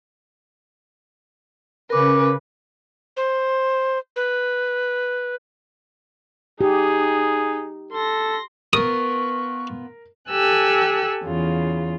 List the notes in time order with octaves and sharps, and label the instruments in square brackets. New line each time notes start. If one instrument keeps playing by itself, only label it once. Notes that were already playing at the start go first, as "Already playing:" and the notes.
[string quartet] C#3 C#4 B4 [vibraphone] A#4 D6
[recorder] C5
B4
[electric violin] D#4 [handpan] G4 [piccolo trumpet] G#4
[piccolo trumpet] A4 [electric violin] C6 A#6
[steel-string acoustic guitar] B3 F4 [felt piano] A#4 [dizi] C#6 [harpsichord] D#6
[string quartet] G4 A4 G#5 E6 F#6
E2 C#3 F4